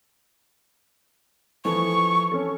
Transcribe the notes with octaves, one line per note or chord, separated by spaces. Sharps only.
E3 F3 A4 C#6
C#4 A4